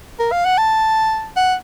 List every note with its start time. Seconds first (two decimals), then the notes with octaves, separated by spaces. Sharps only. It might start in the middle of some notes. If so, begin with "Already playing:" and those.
0.20 A#4
0.32 F5
0.45 F#5
0.58 A5
1.37 F#5